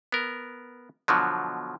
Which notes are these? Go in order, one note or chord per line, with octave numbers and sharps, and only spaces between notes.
B3 A#4
B2 D3 F3 F#3